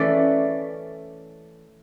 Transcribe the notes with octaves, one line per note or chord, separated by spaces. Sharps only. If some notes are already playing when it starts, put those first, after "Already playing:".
Already playing: E3 A3 C#4 D5